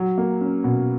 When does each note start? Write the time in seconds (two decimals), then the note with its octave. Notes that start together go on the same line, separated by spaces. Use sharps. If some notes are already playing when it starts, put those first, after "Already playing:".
Already playing: F#3
0.18 A#3
0.41 C#4
0.64 B2